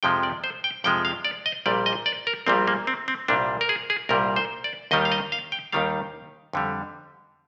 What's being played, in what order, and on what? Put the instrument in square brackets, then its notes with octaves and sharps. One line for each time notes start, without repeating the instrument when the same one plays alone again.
[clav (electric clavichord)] F2 C3 F3 G#3 G5
D5
C5
G5
F2 C3 F3 G#3 G5
F5
D5
D#5
A#1 A#2 G3 D5
D#5
D5
A#4
A#1 A#2 G3 C4
A#3
C4
C4
C2 A#2 G3 D4
A#4
G#4
G#4
C2 A#2 G3 A#4
C5
D5
D#2 D#3 G3 D#5
F5
D#5
F5
G5
D#2 D#3 G3 F5
F2 D3 G3